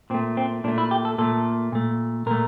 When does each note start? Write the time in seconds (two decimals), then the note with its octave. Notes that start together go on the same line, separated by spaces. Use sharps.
0.10 A#2 C4
0.14 A3
0.37 C4
0.64 A#2 D4
0.68 A3
0.78 E4
0.91 G4
1.05 A4
1.18 A#2 A3 A4
1.72 A#2 A3
2.26 A#2 A3 A#4